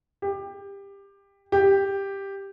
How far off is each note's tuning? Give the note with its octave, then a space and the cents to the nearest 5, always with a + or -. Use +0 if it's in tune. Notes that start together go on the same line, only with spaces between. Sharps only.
G4 +20
G4 +5